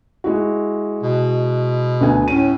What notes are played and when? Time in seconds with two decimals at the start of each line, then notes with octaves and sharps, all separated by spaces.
0.24 G#3 E4 F#4
1.03 B2
2.01 D2 B3 G#5
2.28 A2 C#4 D#7